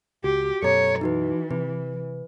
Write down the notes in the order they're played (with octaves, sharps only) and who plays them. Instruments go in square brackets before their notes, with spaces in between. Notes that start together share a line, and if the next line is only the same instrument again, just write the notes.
[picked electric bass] C#2 [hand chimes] F#4 [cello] G4
[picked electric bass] F#2 B2 [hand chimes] A4 A#5 [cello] C#5
[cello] E3 [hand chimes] D#4 F#4 B4
[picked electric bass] C3 [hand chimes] B4